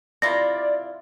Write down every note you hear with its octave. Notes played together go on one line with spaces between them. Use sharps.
C3 E4 F4 D5 A#6